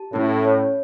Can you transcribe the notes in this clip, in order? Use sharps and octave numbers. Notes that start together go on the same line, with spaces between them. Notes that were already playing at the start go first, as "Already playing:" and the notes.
Already playing: G4 A5
A2 C#4
C#5